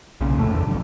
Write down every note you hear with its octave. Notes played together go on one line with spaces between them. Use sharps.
B1 A#2 C#3
A#1 F2 A2 A3
F#1 E2 D3
B1 F2